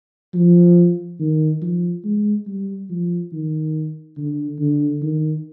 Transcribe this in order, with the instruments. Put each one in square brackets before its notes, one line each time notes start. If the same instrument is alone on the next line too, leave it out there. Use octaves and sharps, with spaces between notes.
[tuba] F3
D#3
F3
G#3
G3
F3
D#3
D3
D3
D#3